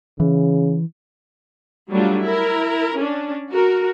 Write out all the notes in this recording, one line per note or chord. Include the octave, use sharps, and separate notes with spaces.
C#3 E3
F#3 G3 A3 D4 F4
E4 A#4
C#4 D4
F#4 A#4